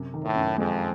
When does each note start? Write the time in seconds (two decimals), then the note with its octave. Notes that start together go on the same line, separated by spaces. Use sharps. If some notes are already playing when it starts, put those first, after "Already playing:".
Already playing: F#2 C3
0.14 D#3
0.24 A2
0.36 F#2
0.58 F2 G#3